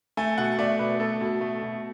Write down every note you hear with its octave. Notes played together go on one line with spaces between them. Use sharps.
A3 G#5
B2 F#5
A3 D5
B2 B4
A3 A4
B2
A3
B2